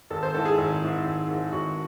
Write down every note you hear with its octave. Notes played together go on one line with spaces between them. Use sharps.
G#1 A4
C5
G#2 E3 A4
G#4
G#1
G#2 E3
G#1
G#2 E3
G#1 F#4